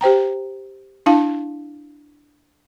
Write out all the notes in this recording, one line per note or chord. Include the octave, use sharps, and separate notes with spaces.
G4 C5 G5 A#5
D4 E4 F5 A5